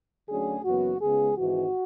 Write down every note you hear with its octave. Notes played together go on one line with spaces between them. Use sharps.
D2 D3 F#3 C#4 G#4
F#1 F#2 E3 B3 F#4
C#2 C#3 G#3 B3 G#4
G#1 G#2 E3 F#4